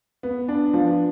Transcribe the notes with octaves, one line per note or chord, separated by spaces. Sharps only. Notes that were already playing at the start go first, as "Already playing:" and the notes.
B3
D4
F3